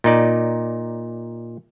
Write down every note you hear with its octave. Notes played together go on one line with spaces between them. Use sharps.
A#2 D#4 D5